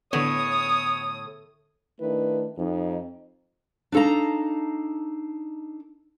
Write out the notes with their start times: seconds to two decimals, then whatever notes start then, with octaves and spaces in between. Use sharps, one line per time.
0.13 A2 D3 B3 C#5 D#6
2.00 D#3 A3 D4 E4 B4
2.58 F2 D#4
3.92 D4 D#4 A4 F5 A#5